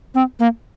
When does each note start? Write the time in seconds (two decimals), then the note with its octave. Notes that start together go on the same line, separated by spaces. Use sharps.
0.15 C4
0.39 A#3